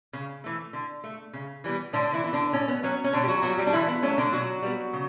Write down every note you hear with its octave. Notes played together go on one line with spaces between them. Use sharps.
C#3
E3 A3
D3
A3
C#3
E3 G3 B3
A2 D3 D4
E3 E4
E3 B3 E4
D3 D4
A2 C#4
B3
F#3 B3 C#4
C#4
B2 D3 D4
G4
F#3 F#4
F#3 G3 B3 F#4
G3 G4
D4
D3 E3 E4
B3
F#3 A3 C#4
D3 D4
B2 F#3 F#4
G3 B3
C#3